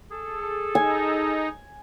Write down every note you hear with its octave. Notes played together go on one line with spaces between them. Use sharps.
G#4 A4
D#4 G#5